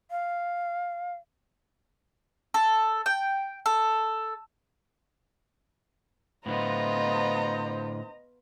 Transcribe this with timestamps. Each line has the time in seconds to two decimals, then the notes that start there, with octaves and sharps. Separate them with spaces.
0.11 F5
2.54 A4
3.06 G5
3.66 A4
6.46 A2 D3 B3 F4 C5 D#5 A#5